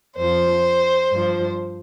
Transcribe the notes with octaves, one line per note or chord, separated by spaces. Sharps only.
F2 F3 C5
G2 F3